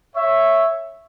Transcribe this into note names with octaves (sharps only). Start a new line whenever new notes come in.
C#5 E5